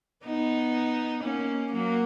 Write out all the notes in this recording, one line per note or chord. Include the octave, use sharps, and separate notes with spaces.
B3 D#4
A#3 C#4
F#3 A#3